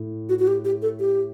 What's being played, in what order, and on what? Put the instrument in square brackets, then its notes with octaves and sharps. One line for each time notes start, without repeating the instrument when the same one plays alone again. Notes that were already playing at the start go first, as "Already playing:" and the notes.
Already playing: [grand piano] A2
[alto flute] F#4
F#4
G4
G4
A4
G4